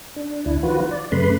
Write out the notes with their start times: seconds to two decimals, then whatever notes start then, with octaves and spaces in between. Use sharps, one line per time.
0.16 D4
0.46 D2 D4 E4
0.63 D#3 F3 F4 F#4 B4
0.91 D5
1.12 F#2 C#3 A3 B4 B5 C6